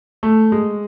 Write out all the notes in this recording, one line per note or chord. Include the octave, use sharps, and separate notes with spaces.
A3
G#3